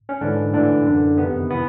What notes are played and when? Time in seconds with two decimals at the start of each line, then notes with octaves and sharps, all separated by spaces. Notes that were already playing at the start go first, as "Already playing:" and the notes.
0.09 C#4
0.21 G#2 D3 E3 D4
0.53 A2 D3 E3 D4
0.86 F#2 D3
1.18 F2 C3 D#3 B3
1.50 E3 B3